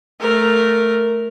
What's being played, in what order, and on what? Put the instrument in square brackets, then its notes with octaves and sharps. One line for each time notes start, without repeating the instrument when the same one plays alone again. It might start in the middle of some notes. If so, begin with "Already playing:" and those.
[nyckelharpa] A3 A#4